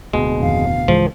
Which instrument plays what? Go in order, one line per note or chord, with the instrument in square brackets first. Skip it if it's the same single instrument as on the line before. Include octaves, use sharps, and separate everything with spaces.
[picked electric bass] D1 B2 [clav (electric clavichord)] G#3
[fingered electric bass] F2 D#3 C4 [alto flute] F5
[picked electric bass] C#2 [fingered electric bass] G#2 E3 G#3 [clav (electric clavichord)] F3